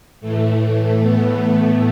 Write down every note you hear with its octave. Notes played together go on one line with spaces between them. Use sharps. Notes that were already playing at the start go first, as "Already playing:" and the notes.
A2 E3 A3
B3
B3